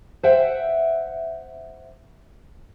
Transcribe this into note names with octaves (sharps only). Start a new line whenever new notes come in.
C5 E5 F#5 G5